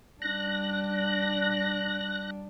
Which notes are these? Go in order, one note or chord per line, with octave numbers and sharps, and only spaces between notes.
G3 D4 F#6 A#6